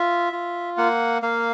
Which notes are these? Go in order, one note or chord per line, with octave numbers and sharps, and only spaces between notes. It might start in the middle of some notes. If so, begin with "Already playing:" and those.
Already playing: F4 E5
F4
A#3 F#5
A#3 F5